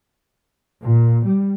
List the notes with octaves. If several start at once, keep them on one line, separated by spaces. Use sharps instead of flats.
A#2
G3